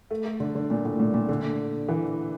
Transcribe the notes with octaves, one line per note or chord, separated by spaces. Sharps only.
A3
A3
D3
D3
A#2
A2
A#2
A#2
D3
E3